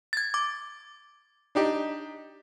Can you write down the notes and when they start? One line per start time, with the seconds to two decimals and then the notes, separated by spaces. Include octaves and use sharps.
0.13 G#6 A6
0.34 D6
1.55 D4 D#4 G4